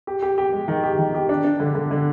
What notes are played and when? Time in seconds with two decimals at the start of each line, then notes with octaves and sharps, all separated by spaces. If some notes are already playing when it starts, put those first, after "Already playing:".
0.07 G4
0.22 G4
0.38 G4
0.53 G#3
0.68 D#3
0.84 G4
0.99 D#3
1.15 G4
1.29 D4
1.44 D4
1.60 D3
1.75 D3
1.91 D3